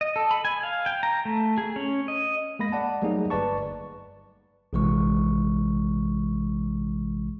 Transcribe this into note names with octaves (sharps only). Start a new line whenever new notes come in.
D#5
A4
B5
G#5
F5
G5
A#5
A3
G#4
C#4
D#5
G#3 A#3 B5 A#6
D5 F#5 A5
F#3 G3 A3 A#3 D#4 G#4
G1 B4 D5 A5 C#6
A#1 C3 E3 G#3 C#6